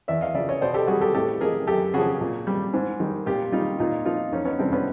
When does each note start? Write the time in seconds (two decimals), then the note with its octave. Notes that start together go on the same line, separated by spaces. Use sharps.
0.08 E2 D5 E5
0.21 D#5 F5
0.34 C#3 F3 D5 E5
0.49 C#5 D#5
0.61 B2 C5 D5
0.74 G4 A4
0.87 G3 F#4 G#4
1.01 G4 A4
1.15 A2 G4 A4
1.41 F3 G#4 A#4
1.67 F#2 G4 A4
1.94 C#3 F3 F#4 G#4
2.21 A#2
2.47 G3
2.74 G#2
3.00 D#3 G3
3.26 A#2 F4 G4
3.52 G3 D#4 F4
3.79 A#2 D#4 F4
4.05 F3 D#4 F4
4.33 F2 C#4 D#4
4.45 B3 C#4
4.59 C3 E3 G3 C4 D4
4.72 B3 C#4